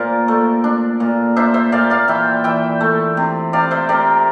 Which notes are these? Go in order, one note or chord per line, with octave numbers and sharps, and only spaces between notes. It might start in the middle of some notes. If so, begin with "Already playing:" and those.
Already playing: A#2 A#4 C5 D5
A3
D4
A#2
D4 C5 E5
C5 E5
A#2 D5 F5
D5 F5
E3 E5 G5
E3 E5 G5
A3
C3
C3 D5 F5
C5 E5
C3 A#4 D5